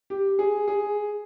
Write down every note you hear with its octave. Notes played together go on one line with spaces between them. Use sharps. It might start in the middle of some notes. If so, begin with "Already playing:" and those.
G4
G#4
G#4